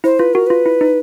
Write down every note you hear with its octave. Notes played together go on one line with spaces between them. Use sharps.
E4 C5
F4 B4
F#4 A#4
F4 B4
E4
D#4